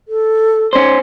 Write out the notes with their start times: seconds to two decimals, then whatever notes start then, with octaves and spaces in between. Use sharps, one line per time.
0.08 A4
0.73 C#4 C5